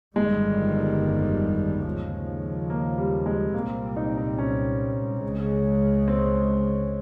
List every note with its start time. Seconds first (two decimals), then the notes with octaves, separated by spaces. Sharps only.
0.16 G1 F2 D#3 G3 G#3
1.85 D#2 C#3 F3
2.70 A#3
2.98 G3
3.26 G#3
3.54 C2 A#2 G3 A#3 C4
3.96 D#4
4.17 D#4
4.39 C#4
5.23 C#2 C#3 G#3
6.08 C4